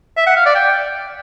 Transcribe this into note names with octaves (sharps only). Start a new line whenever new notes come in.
E5
F#5
F5
D5
G5